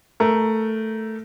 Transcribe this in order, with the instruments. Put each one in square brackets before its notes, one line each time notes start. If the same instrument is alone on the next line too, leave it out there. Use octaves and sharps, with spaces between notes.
[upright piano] A3 A#4